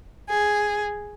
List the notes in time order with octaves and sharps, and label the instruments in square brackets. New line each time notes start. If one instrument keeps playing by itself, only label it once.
[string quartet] G#4